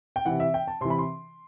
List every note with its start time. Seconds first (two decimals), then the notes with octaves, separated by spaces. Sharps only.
0.16 G5
0.25 C3 E3 F#5
0.40 E5
0.54 G5
0.68 A5
0.81 C3 C6
0.85 E3
0.90 B5
0.98 C6